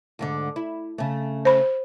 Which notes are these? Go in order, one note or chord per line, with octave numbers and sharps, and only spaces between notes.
D2 G#2 D3
E4
C#3 A3
C5 B5